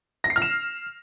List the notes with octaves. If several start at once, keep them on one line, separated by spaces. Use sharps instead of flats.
A#6
C7
F6
E7